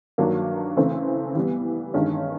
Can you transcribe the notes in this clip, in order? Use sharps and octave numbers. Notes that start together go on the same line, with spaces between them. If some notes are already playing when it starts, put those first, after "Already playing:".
G2 D#3 F#3 A#3 D4
C#3 E3 A3 C4
E3 G3 B3
G2 D#3 G#3 C#4